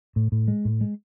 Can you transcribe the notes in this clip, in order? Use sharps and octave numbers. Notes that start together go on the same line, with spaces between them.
A2
A2
G#3
A2
G#3